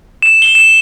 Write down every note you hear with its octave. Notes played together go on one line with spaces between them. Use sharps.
E7
G7
E7